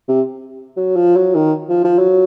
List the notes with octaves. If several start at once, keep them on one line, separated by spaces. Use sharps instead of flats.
C3
F#3
F3
F#3
D#3
F3
F3
F#3